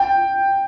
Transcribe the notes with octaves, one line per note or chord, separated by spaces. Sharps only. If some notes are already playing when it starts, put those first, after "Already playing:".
Already playing: G5